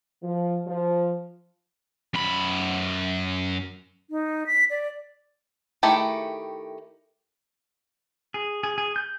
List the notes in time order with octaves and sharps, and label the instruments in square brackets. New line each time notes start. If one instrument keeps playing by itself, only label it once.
[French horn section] F3
F3
[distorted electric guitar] F#2 B5
[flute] D#4
B6
D5
[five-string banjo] D#3 A3 E4 G4 G#4
[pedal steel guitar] G#4
G#4
G#4
G6